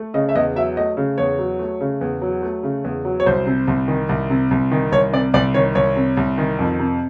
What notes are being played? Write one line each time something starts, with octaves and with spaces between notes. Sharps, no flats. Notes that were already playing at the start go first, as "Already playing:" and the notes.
Already playing: A3
C#3 D#5
E5
E2 D#5
F#3 E5
A3 D#5
C#3
E2 C#5
F#3
A3
C#3
E2
F#3
A3
C#3
E2
F#3
C#5
C2 C5
C3
C2
D#3
C2
C3
C2
D#3
C2 C#5
C3 D5
C2 D5
D#3 C#5
C2 C#5
C3
C2
D#3
F2
C3